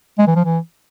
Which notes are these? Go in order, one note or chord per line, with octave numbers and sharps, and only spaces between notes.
G#3
E3
F3
E3